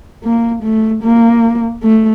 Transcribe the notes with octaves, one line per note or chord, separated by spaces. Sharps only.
A#3
A3
A#3
A3